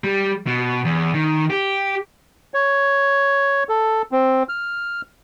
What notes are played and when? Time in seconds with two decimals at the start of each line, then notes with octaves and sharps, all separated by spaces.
0.04 G3
0.47 B2
0.85 E2
1.14 D#3
1.50 G4
2.54 C#5
3.69 A4
4.12 C4
4.49 F6